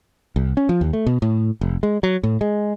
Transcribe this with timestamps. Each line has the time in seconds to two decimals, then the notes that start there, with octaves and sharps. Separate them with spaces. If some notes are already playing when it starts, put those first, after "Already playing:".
0.36 C2
0.57 C#4
0.69 F3
0.81 D#2
0.93 A3
1.06 B2
1.22 A2
1.61 F1
1.83 G#3
2.03 F#3
2.23 A2
2.41 G#3